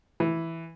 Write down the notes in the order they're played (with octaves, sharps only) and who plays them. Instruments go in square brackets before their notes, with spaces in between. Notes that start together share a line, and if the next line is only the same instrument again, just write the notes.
[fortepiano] E3